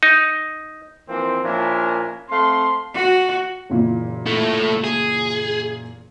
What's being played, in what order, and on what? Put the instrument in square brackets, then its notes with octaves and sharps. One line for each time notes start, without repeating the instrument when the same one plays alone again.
[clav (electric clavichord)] D#4
[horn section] E3 F3 A#3 C4
A#2 F3 C#4 D4 E4 A#4
A3 C4 F5 C6
[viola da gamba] F#4
[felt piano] F#1 A#2 E3
[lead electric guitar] A3 E4
G#4